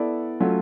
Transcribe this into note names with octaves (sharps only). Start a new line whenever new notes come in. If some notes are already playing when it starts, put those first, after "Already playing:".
Already playing: B3 E4 A4 D5
F#3 A3 C#4 F4